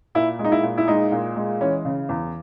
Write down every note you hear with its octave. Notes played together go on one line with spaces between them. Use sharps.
A#2 E4
G#3
D#4
E4
A#2
E4
G#3 D#4
A#2
G#3
E3 C#4
C#3
E2